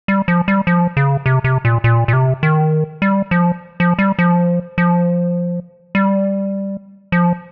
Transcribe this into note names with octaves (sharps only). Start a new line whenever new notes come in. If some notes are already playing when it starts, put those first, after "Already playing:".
G3
F3
G3
F3
C#3
C3
C3
A#2
A#2
A#2
C3
D#3
G3
F3
F3
G3
F3
F3
G3
F3